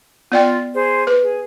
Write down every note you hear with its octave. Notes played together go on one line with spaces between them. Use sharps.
B3 F4 D5 G5
G#4 C5
B4
G#4